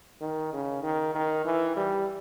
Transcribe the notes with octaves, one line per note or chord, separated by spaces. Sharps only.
D#3
C#3
D#3
D#3
E3
G3